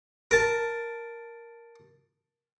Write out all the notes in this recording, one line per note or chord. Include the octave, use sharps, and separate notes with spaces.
A#4 A5